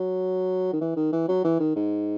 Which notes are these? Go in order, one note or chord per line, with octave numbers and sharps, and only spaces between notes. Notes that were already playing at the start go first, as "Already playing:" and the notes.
Already playing: F#3
D#3
E3
D#3
E3
F#3
E3
D#3
G#2